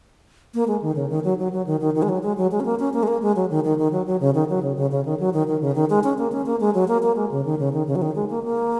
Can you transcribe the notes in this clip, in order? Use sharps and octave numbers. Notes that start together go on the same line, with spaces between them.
A#3
G#3
D#3
C#3
D#3
F#3
F#3
F#3
D#3
D#3
D#3
G#3
F#3
G#3
F#3
G#3
C#4
A#3
C#4
A#3
G#3
A#3
G#3
F#3
D#3
D#3
D#3
F#3
F#3
C#3
D#3
F#3
C#3
C#3
C#3
D#3
F#3
D#3
D#3
C#3
D#3
G#3
C#4
A#3
C#4
A#3
G#3
F#3
A#3
A#3
G#3
C#3
D#3
C#3
D#3
C#3
F#3
D#3
G#3
A#3
A#3